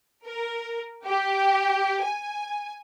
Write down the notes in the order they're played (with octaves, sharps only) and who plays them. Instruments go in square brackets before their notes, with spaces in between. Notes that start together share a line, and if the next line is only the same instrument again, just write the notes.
[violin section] A#4
G4
G#5